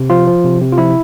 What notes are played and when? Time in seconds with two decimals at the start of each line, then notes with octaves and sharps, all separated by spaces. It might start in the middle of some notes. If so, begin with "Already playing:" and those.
Already playing: C3
0.10 F3 F4
0.27 F3
0.45 C3
0.61 C3
0.72 F4
0.78 F3 E4